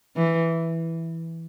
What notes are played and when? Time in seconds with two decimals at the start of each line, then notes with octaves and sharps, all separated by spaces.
0.16 E3